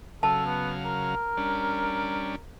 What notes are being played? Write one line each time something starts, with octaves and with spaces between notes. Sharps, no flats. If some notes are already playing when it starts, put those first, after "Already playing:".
C#3 F#3 A4 F5 A5
B3
A#4
G3 C#4 D4